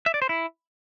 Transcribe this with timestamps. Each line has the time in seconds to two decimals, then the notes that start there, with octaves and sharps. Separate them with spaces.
0.06 E5
0.14 D5
0.22 C5
0.29 E4